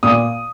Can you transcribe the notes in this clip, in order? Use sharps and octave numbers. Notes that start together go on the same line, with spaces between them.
A#2 D#6